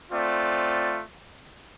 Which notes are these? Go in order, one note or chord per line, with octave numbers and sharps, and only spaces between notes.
A3 C4 F4 D5